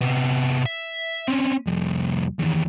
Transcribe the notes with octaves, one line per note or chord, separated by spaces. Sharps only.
C3 B3
E5
C4 C#4
C2 F2
E2 D#3